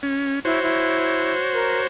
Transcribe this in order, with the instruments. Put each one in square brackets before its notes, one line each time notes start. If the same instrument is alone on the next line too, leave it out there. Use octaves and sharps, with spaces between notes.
[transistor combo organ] C#4
[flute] E4 [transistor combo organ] F#4 C5 C#5
[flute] E4
A#4